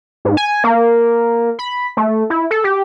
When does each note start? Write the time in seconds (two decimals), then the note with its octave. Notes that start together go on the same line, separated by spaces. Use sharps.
0.25 G#2
0.37 G#5
0.64 A#3
1.59 B5
1.97 A3
2.30 E4
2.51 A4
2.64 G4